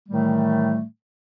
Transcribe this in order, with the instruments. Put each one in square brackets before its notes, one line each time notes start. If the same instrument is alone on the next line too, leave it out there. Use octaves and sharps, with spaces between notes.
[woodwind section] A2 D#3 E3 G3 A3